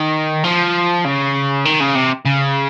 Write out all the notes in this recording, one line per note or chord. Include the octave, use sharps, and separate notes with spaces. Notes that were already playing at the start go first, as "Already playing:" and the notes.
Already playing: D#3
F3
C#3
D#3
C#3
C3
C#3